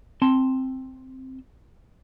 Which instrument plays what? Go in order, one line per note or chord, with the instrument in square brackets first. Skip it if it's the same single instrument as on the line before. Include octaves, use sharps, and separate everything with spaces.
[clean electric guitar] C4 A5 C6